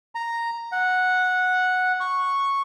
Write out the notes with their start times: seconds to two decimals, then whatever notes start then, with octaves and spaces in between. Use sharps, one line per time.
0.15 A#5
0.72 F#5
2.00 C#6